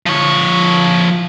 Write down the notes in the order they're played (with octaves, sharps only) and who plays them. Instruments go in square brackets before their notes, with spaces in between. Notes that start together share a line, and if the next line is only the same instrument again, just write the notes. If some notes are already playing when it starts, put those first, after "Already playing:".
[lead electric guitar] F3 C#5